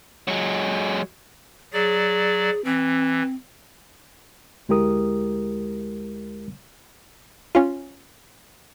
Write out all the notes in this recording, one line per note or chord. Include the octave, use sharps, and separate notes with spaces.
F#3 G#3
F#3 G#4 D5
E3 C4
D2 G#3 E4 G4 A#4 D#6
C#4 F4